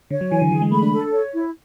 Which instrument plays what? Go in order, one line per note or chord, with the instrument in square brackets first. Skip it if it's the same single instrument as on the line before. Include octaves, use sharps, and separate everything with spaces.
[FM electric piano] D3 [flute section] C#5
[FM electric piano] F#3
[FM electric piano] E3 [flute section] G#5
[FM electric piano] D3
[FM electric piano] E3 [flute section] G#4
[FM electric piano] G#3
[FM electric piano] A3 [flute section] B5
[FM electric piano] D4
[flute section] A4
C#5
E4